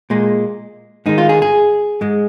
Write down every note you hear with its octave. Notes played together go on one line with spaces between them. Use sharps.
A#2 G#3
G#2 D#3 G#3 D#4
F4
G#4
G#4
G#2 G#3